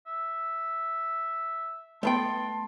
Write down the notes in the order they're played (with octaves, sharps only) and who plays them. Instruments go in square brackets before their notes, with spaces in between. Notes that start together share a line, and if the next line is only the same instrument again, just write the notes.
[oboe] E5
[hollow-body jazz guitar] A3 B3 G5 [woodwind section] A5 C6